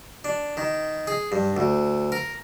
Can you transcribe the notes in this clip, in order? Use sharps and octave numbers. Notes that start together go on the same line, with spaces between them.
D4
D#3
G#4
G2
D2
A#4